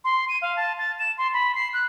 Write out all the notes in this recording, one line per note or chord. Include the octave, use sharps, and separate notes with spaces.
C6
D#7
F5
A5
A6
E7
C6
B5
C7
F#6